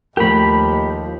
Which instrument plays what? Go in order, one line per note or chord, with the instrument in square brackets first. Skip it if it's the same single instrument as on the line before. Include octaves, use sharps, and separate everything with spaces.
[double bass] D#2 [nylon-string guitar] F3 A3 A#4 [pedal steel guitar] G4 B5